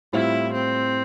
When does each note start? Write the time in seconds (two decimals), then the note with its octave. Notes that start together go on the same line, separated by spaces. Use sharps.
0.13 A2 G3 C4 E4 F4
0.53 C4